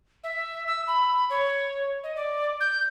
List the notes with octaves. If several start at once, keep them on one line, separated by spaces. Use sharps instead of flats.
E5
E6
B5
C#5
D#5
D5
G6